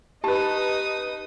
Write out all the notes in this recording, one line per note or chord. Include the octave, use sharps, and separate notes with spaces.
D#4 G4 B4 A5 D#6